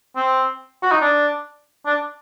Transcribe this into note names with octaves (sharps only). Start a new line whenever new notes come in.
C4
F#4
D#4
D4
D4